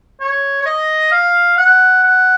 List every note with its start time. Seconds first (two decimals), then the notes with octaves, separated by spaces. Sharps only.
0.20 C#5
0.61 C#5
0.66 D#5
1.12 F5
1.57 F#5
2.03 F#5